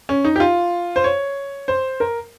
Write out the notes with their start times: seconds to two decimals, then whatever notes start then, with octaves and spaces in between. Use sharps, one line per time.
0.09 C#4
0.25 D#4
0.36 G4
0.40 F4
0.96 C5
1.04 C#5
1.68 C5
2.00 A#4